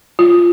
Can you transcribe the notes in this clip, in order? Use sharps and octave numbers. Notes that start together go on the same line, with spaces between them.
F4